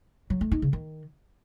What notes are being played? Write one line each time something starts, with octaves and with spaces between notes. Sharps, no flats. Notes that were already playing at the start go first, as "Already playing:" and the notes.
F#3
A3
D#4
C#3
D#3